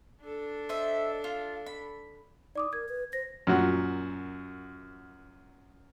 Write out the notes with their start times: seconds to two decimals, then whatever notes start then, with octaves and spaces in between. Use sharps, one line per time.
0.23 D4 A4
0.69 C5 D#5 E5
1.24 F4
1.66 B5
2.56 D#4 D5 D6 D#6
2.73 A#4 G#6
2.89 B4
3.13 C5 A#6
3.47 F#2 A#2 F#4